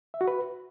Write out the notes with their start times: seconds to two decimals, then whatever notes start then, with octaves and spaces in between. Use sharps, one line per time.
0.14 E5
0.21 F#4
0.28 B4